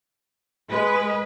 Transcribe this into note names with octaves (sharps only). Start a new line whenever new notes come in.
G#3 B4